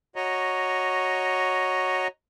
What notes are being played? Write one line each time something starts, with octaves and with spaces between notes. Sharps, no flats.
F#4 C#5 D#5 A#5